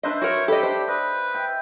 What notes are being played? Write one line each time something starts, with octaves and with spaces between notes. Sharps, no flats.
D4 B4 C5 D#5 E5
F#4 A#4 C#5
G4 A4 D#5 B5
D4 C5
B4 D#5
E5 G5